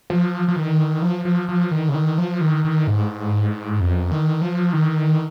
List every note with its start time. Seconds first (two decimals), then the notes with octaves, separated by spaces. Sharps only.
0.10 F3
0.48 F3
0.56 D#3
1.02 F3
1.25 F3
1.48 F3
1.71 D#3
1.89 C#3
1.94 D#3
2.18 F3
2.41 D#3
2.65 D#3
2.87 G#2
3.80 F2
4.11 D#3
4.41 F3
4.73 D#3